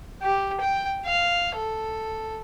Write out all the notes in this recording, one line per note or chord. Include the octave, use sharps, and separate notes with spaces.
G4
G5
F5
A4